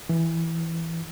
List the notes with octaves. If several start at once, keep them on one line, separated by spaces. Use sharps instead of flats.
E3